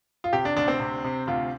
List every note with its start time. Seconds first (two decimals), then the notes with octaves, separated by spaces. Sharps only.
0.24 F4
0.33 C3 G4
0.45 D4
0.56 D2 D4
0.68 C4
0.80 C3
1.04 C3
1.27 D2 F4